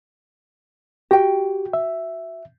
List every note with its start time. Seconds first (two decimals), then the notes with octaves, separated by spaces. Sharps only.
1.11 F#4 G4 G5
1.73 E5